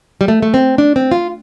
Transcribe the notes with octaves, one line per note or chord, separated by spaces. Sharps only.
G3
A3
A3
C4
D4
C4
F4